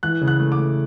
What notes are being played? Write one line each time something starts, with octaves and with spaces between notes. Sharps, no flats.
E3 F#6
C#3
F#6
A3
D6
A3